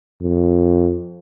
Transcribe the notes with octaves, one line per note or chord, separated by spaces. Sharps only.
F2